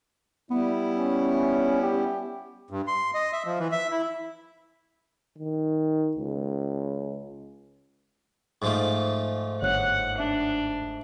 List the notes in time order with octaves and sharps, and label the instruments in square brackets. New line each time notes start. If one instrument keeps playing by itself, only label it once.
[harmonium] G3 E4 [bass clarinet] B3
[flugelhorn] C#4
G4
[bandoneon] G2
C6
D#5
E5
F3
E3
E5
E4
[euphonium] D#3
C#2
[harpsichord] G#2 F3 A3
[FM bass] G1 [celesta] C#5 F#6 [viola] F#5
[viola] D4 [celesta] E5